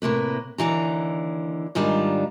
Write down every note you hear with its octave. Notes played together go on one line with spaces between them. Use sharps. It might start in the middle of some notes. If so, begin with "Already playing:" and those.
A2 C3 A#3 B4
D#2 D3 E3 A#5
G#2 D#3 G3 D4 F4